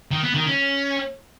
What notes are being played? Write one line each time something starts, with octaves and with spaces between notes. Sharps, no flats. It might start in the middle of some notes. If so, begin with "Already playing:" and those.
D#3
B3
D#3
C#4